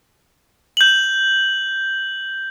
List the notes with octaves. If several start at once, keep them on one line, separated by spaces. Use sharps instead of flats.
G6 F#7